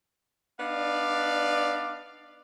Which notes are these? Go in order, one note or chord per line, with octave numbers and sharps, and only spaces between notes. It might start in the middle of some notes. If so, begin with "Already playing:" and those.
B3 D4 D#4 B4 D5 F5